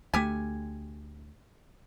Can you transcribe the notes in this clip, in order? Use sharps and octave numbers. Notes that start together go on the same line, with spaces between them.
D2 A3 G4 G#5